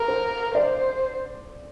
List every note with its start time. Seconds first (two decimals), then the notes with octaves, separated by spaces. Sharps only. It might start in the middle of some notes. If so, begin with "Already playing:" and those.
Already playing: A#4
0.08 C5
0.55 C5 D5